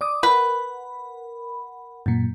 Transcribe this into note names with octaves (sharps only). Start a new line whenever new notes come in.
D5 D6 D#6
A#4 B4 F#5 B5
F#2 A#2